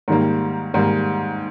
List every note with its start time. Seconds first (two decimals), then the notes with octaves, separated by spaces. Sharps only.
0.08 G#2 D#3 G3 A#3
0.74 G#2 D#3 G3 A#3